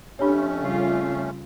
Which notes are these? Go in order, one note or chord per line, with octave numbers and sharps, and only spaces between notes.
F2 A3 C#4 D4 G4 C#5
C#3 G3 F4